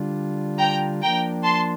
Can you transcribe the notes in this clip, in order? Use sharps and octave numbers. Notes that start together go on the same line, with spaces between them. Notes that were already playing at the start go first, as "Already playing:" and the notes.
Already playing: D3 G3 D4 F4
G5 A#5
F3 A#3 D4 G5 A#5
A5 C6